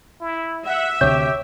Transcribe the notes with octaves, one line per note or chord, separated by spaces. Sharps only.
E4
E5 F#5
D2 C3 G4 C#5 G6